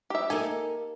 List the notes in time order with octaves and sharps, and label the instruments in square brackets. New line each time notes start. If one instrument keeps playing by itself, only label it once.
[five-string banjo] G4 E5
[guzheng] A#3 D#4 G4 [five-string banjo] A4 G#5